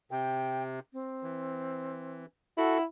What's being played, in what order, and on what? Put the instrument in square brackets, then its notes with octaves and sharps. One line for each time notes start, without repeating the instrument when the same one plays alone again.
[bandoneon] C3 [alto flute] G5
[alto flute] C4
[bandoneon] E3
[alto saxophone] E4 [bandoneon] F#4 A4 [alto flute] F#5